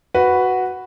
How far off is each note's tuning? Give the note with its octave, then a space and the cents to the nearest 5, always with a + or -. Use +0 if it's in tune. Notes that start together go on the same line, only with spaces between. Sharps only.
F#4 +0 B4 +0